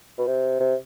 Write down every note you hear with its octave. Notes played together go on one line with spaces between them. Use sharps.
B2
C3
C3